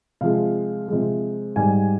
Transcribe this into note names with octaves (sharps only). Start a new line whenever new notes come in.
C3 F3 G#3 F5
C3 F3 G#3
G#2 G3 G#5